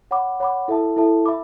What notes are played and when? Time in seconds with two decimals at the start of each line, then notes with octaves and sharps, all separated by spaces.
0.11 C#5 F#5 B5 D6
0.40 C#5 F#5 B5 D6
0.68 E4 A4 E5 A5
0.96 E4 A4 E5 A5
1.26 E5 B5 D6